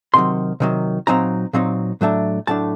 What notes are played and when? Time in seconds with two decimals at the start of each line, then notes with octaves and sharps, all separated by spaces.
0.14 C3 D#3 F#3 C6
0.60 C3 D#3 F#3
1.07 A#2 F#3 C4 D#4 A#5
1.53 A#2 F#3 C4 D#4
2.01 A2 F#3 A3 D4
2.47 A2 F#3 A3 D4 A5